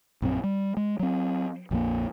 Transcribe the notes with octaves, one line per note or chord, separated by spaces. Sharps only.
A#1 F#2 C4
G3
G#3
F#3 C4
A#1 F2 E3 A#3